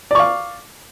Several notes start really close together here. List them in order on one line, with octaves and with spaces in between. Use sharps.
D5 C#6 F5